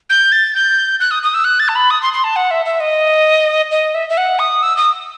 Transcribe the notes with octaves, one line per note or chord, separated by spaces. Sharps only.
G6
A6
G6
F#6
D#6
D#6
E6
F#6
A6
A5
B5
D#6
C6
C6
A5
F#5
E5
E5
D#5
D#5
E5
E5
F#5
D#6
E6
D#6